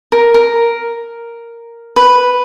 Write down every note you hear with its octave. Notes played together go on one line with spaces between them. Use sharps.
A#4
A#4
B4